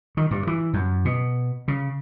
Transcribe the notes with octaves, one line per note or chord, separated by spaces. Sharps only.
D#3
G2
E3
F#2
B2
C#3